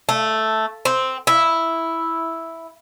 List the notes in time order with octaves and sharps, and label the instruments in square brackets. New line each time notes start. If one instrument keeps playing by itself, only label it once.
[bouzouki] A3
C4
E4